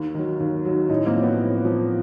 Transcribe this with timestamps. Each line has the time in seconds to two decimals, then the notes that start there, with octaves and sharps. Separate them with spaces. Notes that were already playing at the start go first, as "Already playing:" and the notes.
Already playing: D#2
0.15 D#3 F#3
0.40 D#2
0.65 D#3 F#3
0.89 A2 C#4 D#4
1.06 A#3 C4
1.15 F3
1.23 B3 C#4
1.40 A2
1.65 F3